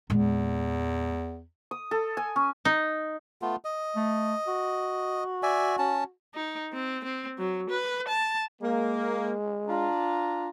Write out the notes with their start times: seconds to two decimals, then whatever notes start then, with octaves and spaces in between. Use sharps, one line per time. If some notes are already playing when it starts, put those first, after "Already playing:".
0.10 E2 A#2 G#3
1.71 D#6
1.91 A4
2.17 G#5
2.36 C#4
2.65 D#4
3.42 A3 B3 F4
3.65 D#5
3.96 A3
4.47 F#4
5.43 D5 E5 G#5
5.79 C#4 A5
6.35 D#4
6.73 C4
7.04 C4
7.38 F#3
7.70 B4
8.08 A5
8.62 G#3 A#3
9.68 D4 F4 A#5